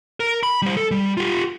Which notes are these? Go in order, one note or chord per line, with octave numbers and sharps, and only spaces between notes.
A#4
B5
G3 C5
A4
G3
F4 G4